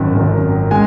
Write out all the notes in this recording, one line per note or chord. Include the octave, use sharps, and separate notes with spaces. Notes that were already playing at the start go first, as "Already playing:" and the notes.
Already playing: G#1 F#2 D#3
G#1 F#2 D#3
G#3 G#5